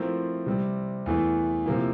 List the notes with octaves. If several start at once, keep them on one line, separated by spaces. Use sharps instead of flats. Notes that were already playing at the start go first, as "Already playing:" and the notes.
Already playing: F3 A3 C4 E4 A#4
C3 G3 C4
E2 E3 A3 E4
C3 F3 A#3 E4